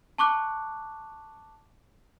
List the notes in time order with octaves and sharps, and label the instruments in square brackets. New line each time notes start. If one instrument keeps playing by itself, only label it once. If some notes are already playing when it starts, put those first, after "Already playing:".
[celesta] A5 C#6 D6 F#6